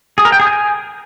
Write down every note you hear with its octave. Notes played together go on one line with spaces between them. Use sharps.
G#4
A#4
G5
G#4
G#5